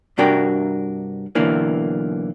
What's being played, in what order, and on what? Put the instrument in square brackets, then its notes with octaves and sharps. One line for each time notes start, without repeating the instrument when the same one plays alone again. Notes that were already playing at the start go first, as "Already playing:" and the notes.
[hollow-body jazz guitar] G2 C3 D4 F#4 A#4 G5
B1 D3 E3 A#3